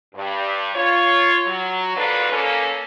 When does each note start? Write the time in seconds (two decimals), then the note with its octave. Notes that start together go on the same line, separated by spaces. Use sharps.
0.15 G2
0.75 F4 C#5
1.46 F#3
1.96 D#2 G#2 D4 F4 A4 B4
2.31 A#3 C#4 A4